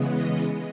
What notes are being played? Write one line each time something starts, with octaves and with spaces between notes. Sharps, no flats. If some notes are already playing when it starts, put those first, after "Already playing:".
Already playing: C#3 E3 G#3 B3
D#5